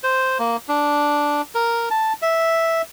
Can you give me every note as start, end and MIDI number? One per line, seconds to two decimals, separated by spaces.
0.03 0.38 72
0.39 0.57 58
0.69 1.42 62
1.55 1.89 70
1.91 2.13 81
2.22 2.82 76